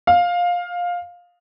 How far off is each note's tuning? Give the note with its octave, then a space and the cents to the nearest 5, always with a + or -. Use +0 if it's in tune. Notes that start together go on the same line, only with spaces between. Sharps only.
F5 +15